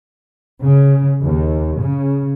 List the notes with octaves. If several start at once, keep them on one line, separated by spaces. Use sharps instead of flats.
C#3
D#2
C#3